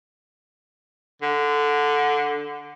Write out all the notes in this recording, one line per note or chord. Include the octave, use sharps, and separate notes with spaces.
D3